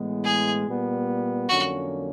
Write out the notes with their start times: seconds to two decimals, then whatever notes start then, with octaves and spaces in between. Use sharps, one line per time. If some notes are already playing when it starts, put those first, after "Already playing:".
Already playing: A2 E3 G#3 B3
0.24 G#4
0.66 A#2 G3 B3
1.48 F2 D3 F#3 A#3 C#4 F#4